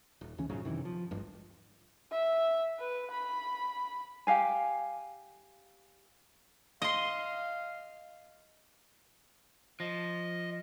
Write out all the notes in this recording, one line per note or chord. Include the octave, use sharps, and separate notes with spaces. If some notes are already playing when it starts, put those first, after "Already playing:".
D#1
C#2 C#3 E3 C#4
A#1 G#2 C#3 F#3
F#2 C3 D#3 E3
F3
D1 G#1 G2
E5
B4
B5
G4 F5 G#5
D#5 F5 C6
F3 D#5